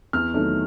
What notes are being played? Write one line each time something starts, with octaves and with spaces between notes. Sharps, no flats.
E2 F6
C3 D#3 F#3 A3